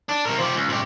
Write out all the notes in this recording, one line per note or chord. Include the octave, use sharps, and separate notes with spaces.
D4
C3 A#4
F3 G4
C#2
C#2 G4